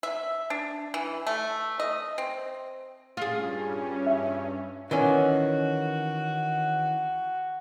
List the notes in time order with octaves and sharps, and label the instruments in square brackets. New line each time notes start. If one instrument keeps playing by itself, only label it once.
[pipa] E5
D4
E3
A3
D#5
C4
[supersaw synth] G2 C#4 [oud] F4 G#4
[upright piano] E5
[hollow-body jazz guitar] D#3 E3 C#4 [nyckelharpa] F#4